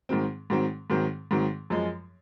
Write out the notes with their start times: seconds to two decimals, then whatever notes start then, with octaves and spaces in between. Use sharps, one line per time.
0.09 G#2 D#3 F#3 C4
0.50 G#2 D#3 F#3 C4
0.90 G#2 D#3 F#3 C4
1.31 G#2 D#3 F#3 C4
1.70 F#2 F3 G#3